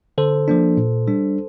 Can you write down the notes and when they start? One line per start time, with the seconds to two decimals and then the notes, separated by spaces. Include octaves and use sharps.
0.18 D3 A4 C5
0.48 F3 A#3 D4
0.77 A#2
1.07 G3 D4